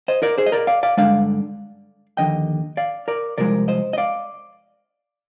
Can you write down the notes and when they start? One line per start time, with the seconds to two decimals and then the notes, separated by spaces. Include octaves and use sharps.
0.08 C5 D#5
0.22 A#4 D5
0.38 G#4 C5
0.46 D#5
0.52 A#4 D5
0.67 D5 F5
0.83 D5 F5
0.97 G2 D3 G#3 D5 F5
2.17 D#2 D3 F3 D#5 G5
2.77 D5 F5
3.08 A#4 D5
3.38 C2 C3 F3 G#3 A#4 D5
3.68 C5 D#5
3.93 D#5
3.98 D5 F5